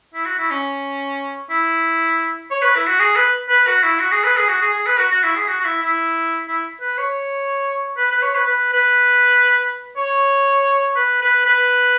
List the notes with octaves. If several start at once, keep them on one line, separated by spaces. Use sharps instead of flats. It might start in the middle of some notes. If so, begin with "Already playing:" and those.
E4
F#4
E4
C#4
E4
C#5
B4
E4
F#4
G#4
B4
B4
F#4
E4
F#4
G#4
B4
G#4
F#4
G#4
G#4
B4
F#4
F#4
E4
G#4
F#4
F#4
E4
E4
E4
B4
C#5
B4
B4
C#5
B4
B4
B4
C#5
B4
B4
B4